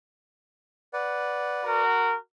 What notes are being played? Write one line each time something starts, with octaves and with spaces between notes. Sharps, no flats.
B4 D5 F#5
F#4 A#4